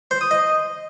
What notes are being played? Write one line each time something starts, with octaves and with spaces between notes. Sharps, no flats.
C5
D#6
D#5